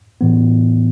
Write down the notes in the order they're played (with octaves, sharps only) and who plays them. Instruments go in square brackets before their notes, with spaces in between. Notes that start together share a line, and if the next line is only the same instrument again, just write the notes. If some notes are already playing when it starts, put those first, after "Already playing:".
[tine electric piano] A2 E3 B3